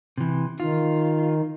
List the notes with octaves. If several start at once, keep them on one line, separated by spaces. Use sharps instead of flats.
C3 E3
D#3 F4